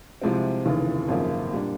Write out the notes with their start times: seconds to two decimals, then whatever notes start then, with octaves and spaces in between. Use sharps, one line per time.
0.22 C2 C3 F3 G#3 C4
0.65 F1 D#2 C#3 E3
1.08 G#1 F#2 C#3 F3 A#3
1.53 A#2 G3 A#3 D4